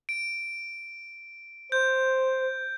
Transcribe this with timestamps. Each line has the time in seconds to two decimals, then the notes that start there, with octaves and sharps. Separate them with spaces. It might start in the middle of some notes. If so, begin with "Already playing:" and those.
0.09 D7
1.72 C5 G6